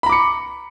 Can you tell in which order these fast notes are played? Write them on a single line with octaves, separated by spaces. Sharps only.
B5 A#5 D6 C#7